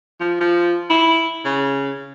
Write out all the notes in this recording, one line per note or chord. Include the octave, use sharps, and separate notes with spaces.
F3
F3
E4
C#3